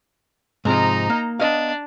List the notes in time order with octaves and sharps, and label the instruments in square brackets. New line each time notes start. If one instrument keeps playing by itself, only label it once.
[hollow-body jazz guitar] G#2 C3 F3 [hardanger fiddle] D#4 A#5
[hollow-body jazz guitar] A#3
[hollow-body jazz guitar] B3 D#5 F5 [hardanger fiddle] D4